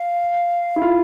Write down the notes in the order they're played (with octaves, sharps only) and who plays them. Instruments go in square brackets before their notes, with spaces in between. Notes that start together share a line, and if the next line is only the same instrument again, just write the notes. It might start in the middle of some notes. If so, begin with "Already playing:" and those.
Already playing: [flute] F5
[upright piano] E4
F4